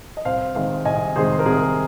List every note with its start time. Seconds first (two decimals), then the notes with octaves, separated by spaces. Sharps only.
0.17 D#5
0.25 C2 C5 F5
0.55 C3 D#3 G#3 C5 F5
0.85 C2 D#5 G#5
1.16 C3 D#3 G#3 G#4 C5
1.39 A#4
1.46 C2 G#4